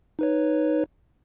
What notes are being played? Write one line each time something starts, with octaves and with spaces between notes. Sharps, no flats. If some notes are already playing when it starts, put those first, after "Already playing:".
D#4 B4 C#5